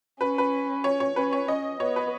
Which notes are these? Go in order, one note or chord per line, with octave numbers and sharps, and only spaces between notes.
C#4 B4
B4
C#5
C#5
C#4 B4
C#5
C#4 D#5
B3 C#5
B4